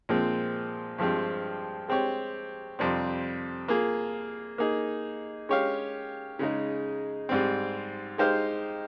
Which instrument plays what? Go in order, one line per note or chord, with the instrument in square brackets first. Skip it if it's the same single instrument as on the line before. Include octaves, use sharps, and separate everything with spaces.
[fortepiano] A#2 F3 G#3 C4
G2 F3 G#3 C4 G4
G#3 C4 G4 C#5
F2 C3 G3 C4
A#3 F4 G#4
A#3 D#4 G#4
G#3 C#4 G4 C#5 F5
C#3 G#3 D#4
G#2 G3 C4
G#3 D#4 G4 C5 F5